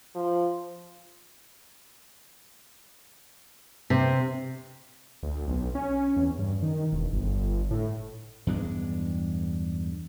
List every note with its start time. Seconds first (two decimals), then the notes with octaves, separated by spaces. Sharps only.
0.15 F3
3.90 C3
5.23 D2
5.48 B1
5.75 C#4
6.17 E2
6.38 G2
6.63 D#3
6.92 E1
7.13 G1
7.71 A2
8.47 E2 G2 G#3 D4